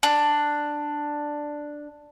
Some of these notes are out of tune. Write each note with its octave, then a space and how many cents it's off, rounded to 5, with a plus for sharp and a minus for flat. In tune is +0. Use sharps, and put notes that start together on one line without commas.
D4 +5